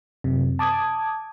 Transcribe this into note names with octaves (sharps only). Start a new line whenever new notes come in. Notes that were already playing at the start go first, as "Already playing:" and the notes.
F#2 C3
A5 D6 D#6 G#6